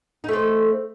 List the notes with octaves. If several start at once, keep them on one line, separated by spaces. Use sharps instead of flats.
A3 C4 D#4